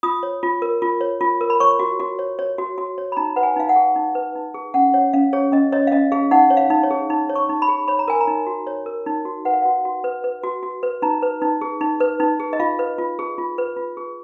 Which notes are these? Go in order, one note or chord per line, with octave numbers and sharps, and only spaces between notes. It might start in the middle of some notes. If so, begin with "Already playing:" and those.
F4 D#6
C#5
F4
A#4
F4
C#5
F4
A#4
B5
C#5 C#6
F#4
F#4
C#5
C#5
F#4
F#4
C#5
B5
D#4 A#5
B4 F#5
G#5
D#4 F5
F#5
G#4
D#4
B4
D#4
G#4
C#4 F#5
C#5 F#5
C#4 F5
G#4 C#5
C#4 D#5
C#5 D#5
F5
C#4 D#5
G#4 F5
D#4 F#5
C#5
F5
D#4
C#5
G#4
D#4
C#5
C#6
D#4
B5
G#4
C#5 B5
A#5
A#4 G#5
A#5
D#4
F#4
C#5
A#4
D#4
F#4
B4 F#5
F5
F#4 F#5
F#4
B4
B4
F#4
F#4
B4
D#4 A#5
B4
D#4
G#4
D#4
B4
D#4
G#4
D#5
F4 F5
B4
F4
G#4
F4
B4
F4
G#4